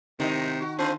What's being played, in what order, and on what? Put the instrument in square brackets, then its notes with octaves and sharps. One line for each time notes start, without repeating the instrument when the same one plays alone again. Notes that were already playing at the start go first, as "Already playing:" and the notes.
[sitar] G#2 D#4 [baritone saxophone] C3 [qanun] D#3
[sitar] F#4
[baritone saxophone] D3 [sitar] C4 F4 C5